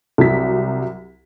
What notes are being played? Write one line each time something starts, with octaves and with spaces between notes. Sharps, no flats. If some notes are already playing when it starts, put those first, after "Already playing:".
C2 F#3 B6